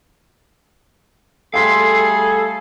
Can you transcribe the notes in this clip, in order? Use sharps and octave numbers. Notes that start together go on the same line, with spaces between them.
G3 A3 G#4 A4 F5 G5 C6 B6